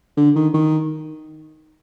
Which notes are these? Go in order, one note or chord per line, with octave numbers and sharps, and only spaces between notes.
D3
D#3
D#3